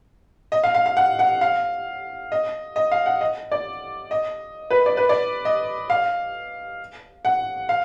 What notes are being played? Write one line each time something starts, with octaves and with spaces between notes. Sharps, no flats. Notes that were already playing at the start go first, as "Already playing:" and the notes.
D#5
F5
F5
F5
F#5
F#5
F5
D#5
D#5
F5
F#5
D#5
D5
D#5
B4
D5
B4
D5
D#5
F5
F#5
F5